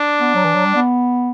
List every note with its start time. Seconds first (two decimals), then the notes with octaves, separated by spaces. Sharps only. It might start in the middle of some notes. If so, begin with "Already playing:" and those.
Already playing: D4
0.20 B3
0.34 F#3
0.45 E3
0.55 F#3
0.65 G3
0.75 B3